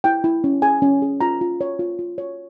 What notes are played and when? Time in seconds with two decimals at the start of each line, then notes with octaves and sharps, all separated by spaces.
0.04 E4 G5
0.24 E4
0.44 C#4
0.62 G#4 G#5
0.82 C#4
1.02 G#4
1.21 F4 A#5
1.41 F4
1.61 C#5
1.79 F4
1.99 F4
2.18 C#5